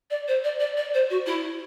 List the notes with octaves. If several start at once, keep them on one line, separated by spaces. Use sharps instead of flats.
D5
C5
D5
D5
D5
C5
F#4
E4